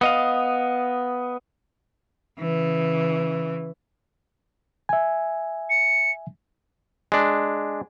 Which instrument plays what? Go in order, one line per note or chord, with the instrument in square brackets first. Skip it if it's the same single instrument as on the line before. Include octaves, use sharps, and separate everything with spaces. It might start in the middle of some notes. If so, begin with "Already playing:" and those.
[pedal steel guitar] B3 D#5 F5
[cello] C#3 E3
[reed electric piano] E5 G#5
[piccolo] C#7
[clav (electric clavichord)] G#3 D4